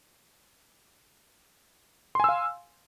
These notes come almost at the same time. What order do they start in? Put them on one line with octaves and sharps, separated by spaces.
C6 G#5 E6 F5